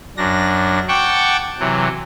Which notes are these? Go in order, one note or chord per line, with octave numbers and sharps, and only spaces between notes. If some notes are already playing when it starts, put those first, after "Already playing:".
F#2 D4 A#6
F#5 G5 A5 C#6 D6
C3 E3 F#3